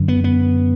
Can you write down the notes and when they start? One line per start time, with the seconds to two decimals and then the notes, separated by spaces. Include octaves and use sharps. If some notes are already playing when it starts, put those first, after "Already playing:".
Already playing: F#2 D3
0.08 B3
0.24 B3